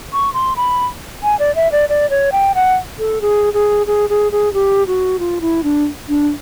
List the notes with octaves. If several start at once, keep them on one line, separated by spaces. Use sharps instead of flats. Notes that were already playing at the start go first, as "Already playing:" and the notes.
C#6
C6
B5
G#5
D5
E5
D5
D5
C#5
G5
F#5
A4
G#4
G#4
G#4
G#4
G#4
G4
F#4
F4
E4
D4
D4